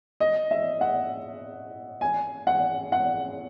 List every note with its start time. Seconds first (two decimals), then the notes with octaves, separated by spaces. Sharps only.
0.20 D#5
0.51 E5
0.81 F#5
2.01 G#5
2.47 F#5
2.92 F#5